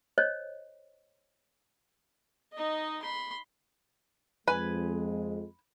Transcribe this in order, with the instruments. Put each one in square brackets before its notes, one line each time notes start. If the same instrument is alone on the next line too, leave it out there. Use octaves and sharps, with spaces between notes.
[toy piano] C5 C#5 D#5
[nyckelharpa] D#4 D#5
B5 C6
[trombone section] F2 G#3 [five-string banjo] B4 G#5